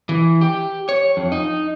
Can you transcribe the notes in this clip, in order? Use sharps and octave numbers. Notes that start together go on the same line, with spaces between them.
E3
G4
C#5
F2
D#4